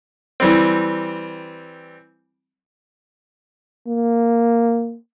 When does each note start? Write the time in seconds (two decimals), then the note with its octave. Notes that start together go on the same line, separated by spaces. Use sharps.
0.40 E3 G3 C4
3.88 A#3